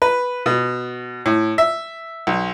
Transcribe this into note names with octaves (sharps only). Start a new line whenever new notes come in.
B4
B2
A2
E5
B1